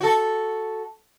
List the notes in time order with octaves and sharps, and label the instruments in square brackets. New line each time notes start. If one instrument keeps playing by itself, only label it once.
[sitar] F#4 A4